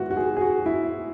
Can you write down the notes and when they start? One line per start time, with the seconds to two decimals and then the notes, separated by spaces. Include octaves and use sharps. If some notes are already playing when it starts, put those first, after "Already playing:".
Already playing: G#2 D#3 F#3 B3 E4 F#4
0.11 F#4
0.17 G#4
0.36 G#4
0.41 F#4
0.66 E4